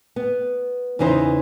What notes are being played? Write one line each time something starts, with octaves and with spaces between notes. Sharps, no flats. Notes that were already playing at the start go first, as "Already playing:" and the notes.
B3
E2 C#3 E3 D#4 C5